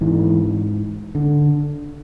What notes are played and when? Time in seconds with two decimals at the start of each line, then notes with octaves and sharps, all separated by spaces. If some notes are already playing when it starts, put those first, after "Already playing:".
0.01 G#2 E3
1.15 D3